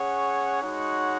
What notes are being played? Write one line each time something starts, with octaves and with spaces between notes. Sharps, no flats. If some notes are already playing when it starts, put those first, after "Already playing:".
Already playing: C#4 G#4 C#5 F#5
G#3 D#4 F#4 C#5 F#5